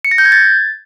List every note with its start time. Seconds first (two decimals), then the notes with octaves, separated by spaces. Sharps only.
0.05 C#7
0.11 A#6
0.18 G6
0.25 G#6
0.32 A6